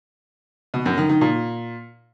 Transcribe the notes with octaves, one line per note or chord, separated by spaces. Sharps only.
B2
F#2
D#3
D#3
A#2